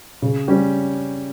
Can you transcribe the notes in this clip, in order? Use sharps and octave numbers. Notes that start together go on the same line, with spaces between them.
C#3
G3 C#4